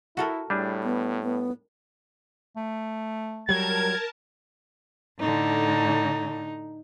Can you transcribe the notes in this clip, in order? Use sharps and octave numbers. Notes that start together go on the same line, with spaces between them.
E4 F#4 A4 A#4
A2 G3 D4 G#4
B3
B3
A3
F#3 G3 A#4 A5 G#6
A2 D3 D#4